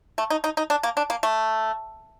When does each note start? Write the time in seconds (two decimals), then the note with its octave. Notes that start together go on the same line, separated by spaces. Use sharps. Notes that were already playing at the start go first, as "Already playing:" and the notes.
0.18 A3
0.30 D#4
0.44 D#4
0.57 D#4
0.70 D4
0.83 A#3
0.97 D4
1.10 A#3
1.23 A3